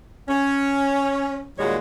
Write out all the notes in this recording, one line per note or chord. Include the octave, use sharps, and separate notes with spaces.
C#4
D#2 A#2 G3 G#3 F#4 C#5